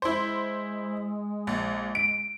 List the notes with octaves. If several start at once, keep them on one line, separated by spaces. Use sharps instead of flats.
G#3 E4 C5
A#1
D7